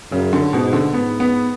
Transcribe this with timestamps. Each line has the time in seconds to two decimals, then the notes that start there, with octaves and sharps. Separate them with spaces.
0.12 F#2 C#3
0.33 D3
0.52 G#2 B2
0.73 D3
0.93 G#2 B3
1.20 B3